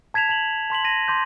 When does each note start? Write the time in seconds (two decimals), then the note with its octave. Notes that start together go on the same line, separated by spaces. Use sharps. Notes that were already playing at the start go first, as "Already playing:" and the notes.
0.14 A5 G#6 B6 E7 F7
0.29 A5 F7 F#7
0.70 A5 C6 B6 F#7
0.84 A#6 D#7 F#7
1.08 C6 D6 G6